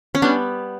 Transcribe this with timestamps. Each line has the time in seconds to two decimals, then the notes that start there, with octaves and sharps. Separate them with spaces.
0.15 C#4
0.22 G3 B3 D4